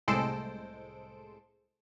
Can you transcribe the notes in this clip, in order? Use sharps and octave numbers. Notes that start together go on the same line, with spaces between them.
C2 A2 G#3 A4 C5 D7